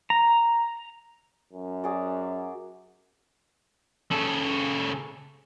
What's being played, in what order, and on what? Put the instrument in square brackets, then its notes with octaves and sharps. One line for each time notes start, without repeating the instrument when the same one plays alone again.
[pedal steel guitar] A#5
[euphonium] F#2
[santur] F#4 G#4 D5
[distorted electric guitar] C#3 A4